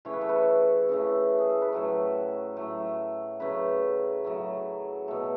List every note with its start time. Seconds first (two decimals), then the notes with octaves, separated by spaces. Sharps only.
0.05 C#3 E3 A3 C#5
0.13 B4
0.21 A4
0.29 B4
0.89 C#3 E3 A3
1.38 G#4
1.50 A4
1.62 B4
1.72 A2 F#3 A3 C#5
2.57 A2 F#3 A3
3.40 C#3 F#3 A3 B4
4.24 C#3 F#3 A3
5.08 B2 A3 A4